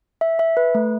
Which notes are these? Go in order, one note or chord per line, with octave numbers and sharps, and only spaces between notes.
E5
E5
B4
A3